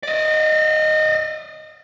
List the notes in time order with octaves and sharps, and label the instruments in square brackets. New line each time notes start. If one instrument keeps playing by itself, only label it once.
[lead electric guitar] D5 D#5